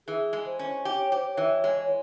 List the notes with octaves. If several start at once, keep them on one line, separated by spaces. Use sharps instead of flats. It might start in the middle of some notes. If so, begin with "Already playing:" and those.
E3 G#4
G#3
C5
C#4
G4
C#5
G4 C5
C#5
E3
G#3